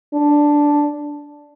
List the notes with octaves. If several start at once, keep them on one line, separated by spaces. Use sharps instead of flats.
D4